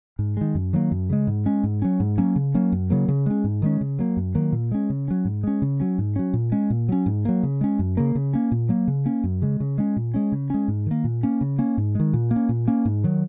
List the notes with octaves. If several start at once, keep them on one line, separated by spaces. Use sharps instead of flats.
G#2
D#3 G#3
F#2
D#3 F#3 A#3
F#2
C#3 G#3
G#2
G#3 C#4
G#2
F#3 C#4
G#2
F#3 A#3 C#4
C#3
F#3 A#3 C#4
F#2
C#3 F#3 A#3
C#3
G#3 C#4
G#2
D#3 G#3 C#4
C#3
F#3 A#3
F#2
D#3 F#3 A#3
A#2
G#3 C#4
C#3
F#3 C#4
G#2
G#3 C#4
C#3
F#3 C#4
G#2
F#3 C#4
A#2
G#3 C#4
A#2
F#3 C#4
G#2
F#3 A#3
C#3
G#3 C#4
F#2
C#3 A#3
C#3
A#3 C#4
A#2
F#3 A#3
C#3
A#3 C#4
F#2
C#3 G#3
C#3
G#3 C#4
A#2
G#3 C#4
C#3
G#3 C#4
G#2
D#3 A#3
A#2
A#3 C#4
C#3
A#3 C#4
G#2
D#3 G#3
A#2
A#3
C#4
A#2
A#3 C#4
G#2
D#3 F#3